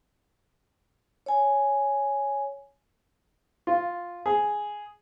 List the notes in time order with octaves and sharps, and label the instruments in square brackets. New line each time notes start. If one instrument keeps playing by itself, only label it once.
[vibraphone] C#5 G#5
[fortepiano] F4
G#4